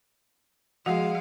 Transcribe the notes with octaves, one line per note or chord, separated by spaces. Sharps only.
F3 G#3 F#4 F5 F#5